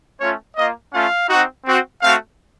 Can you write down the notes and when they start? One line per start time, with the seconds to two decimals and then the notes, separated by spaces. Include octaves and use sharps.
0.19 A3 C#4 F4 C#5
0.56 A#3 F4 D#5
0.93 A3 C#4 F4 F5
1.29 C4 D#4 F#4
1.65 C4 F#4
2.01 A3 C4 F#4 F5